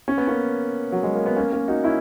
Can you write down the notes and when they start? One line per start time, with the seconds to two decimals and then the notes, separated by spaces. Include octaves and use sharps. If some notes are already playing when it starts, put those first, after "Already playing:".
0.08 C#4
0.18 B3
0.27 A#3 C#4
0.92 F#3
1.03 G#3
1.15 A#3
1.26 B3
1.36 A#3 C#4
1.53 A#3 C#4
1.68 D#4 F#4
1.84 C#4 E4